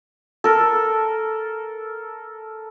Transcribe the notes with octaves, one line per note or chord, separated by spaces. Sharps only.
A4 A#4